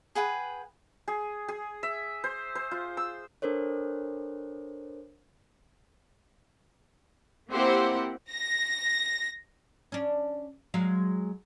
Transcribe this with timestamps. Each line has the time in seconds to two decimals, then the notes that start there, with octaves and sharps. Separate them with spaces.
0.15 G#4 B4 F#5 G5
1.08 G#4
1.48 G#4
1.83 E5
2.24 C5
2.55 C5
2.71 F4
2.97 E6
3.42 D4 A4 A#4 C5 C#5
7.51 A#3 C4 E4 G4 C5 F#5
8.30 A#6
9.92 C#4 D4
10.74 F#3 G#3 F5